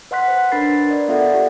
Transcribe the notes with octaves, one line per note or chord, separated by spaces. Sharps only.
B4 D#5 F#5 C6 F#6 B6
C5
D4 A#4 B4 B5 A6 C7
A#4 D5 D#5
B3 F4 A4 D5 E5 F#5
G4